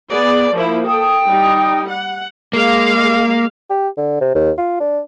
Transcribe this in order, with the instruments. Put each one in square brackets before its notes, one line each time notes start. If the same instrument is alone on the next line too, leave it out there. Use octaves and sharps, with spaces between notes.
[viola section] B3 G#4 D5
F3 A#3 E4
[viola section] A4 [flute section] G5 D#6
[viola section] G3 D#4
F#5
[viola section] G#3 F5 [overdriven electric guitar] A#3
[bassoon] G4
D3
C3
D#2
F4
D4